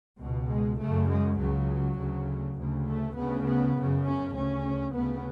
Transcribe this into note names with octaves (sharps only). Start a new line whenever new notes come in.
C#2 B2
G#3
F#2 C#3 A3
G#3
C#2 C#3 F#3
D2 C#3
D2 C#3
A3
D2 C#3 B3
B3
F#2 C#3
C#4
D2 C#3 C#4
D2 C#3 B3